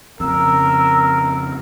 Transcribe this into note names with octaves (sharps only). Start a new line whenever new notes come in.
F2 C#3 A#4 E6